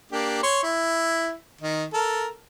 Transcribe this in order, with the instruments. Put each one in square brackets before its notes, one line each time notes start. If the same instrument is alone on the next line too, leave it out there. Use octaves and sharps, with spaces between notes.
[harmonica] A#3 D4 G4
C#5 C6 C#6
E4
D#3 D#4
A4 A#4